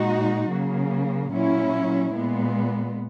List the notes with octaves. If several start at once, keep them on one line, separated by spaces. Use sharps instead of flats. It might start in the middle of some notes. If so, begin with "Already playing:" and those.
Already playing: A#2 G#3 D#4 F#4
C#3 F#3 A#3
A#2 F#3 C#4 E4
A#2 G#3 B3